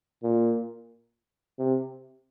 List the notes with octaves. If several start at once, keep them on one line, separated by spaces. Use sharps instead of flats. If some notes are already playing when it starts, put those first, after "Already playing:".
A#2
C3